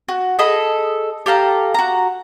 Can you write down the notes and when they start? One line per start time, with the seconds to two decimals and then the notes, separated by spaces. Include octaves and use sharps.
0.08 F#4
0.39 G#4 A4 D#5 B5
1.26 G4 A4 F5 A#5
1.74 F#4 A#5